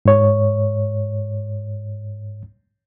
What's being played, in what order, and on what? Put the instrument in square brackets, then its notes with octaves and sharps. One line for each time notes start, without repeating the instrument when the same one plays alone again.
[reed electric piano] G#2 C#5